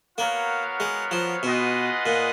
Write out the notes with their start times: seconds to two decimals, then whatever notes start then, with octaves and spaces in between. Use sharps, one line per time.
0.18 A#3 B3 F#4 A#4 C#5 F5
0.80 G#3
1.11 F3
1.43 B2 F4 G#4 B4 D#5 F#5
2.06 A#2